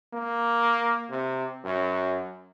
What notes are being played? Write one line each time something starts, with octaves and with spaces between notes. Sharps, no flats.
A#3
C3
F#2